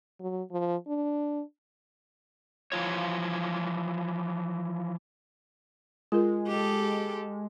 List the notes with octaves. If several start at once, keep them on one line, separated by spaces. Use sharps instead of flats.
F#3
F3
D4
E3 F3 F4 C#5
G#3 F4 A#4
G4 A4